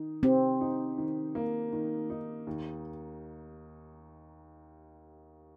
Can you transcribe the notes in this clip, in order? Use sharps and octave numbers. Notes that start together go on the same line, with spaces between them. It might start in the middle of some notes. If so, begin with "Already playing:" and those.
Already playing: D#3 D#4
C4 G4
D#4
D#3
A#3
D#3
D#4
D#2